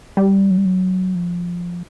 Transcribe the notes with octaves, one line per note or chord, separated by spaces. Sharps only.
G3
F#3
G3
F#3
F3